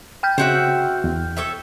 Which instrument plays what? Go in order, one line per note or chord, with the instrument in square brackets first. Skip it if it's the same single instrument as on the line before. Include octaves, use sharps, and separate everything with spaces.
[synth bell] G5 F6 G6
[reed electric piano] C#3 [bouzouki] C4 F#4 E5
[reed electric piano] E2
[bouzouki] A4 C#5 E5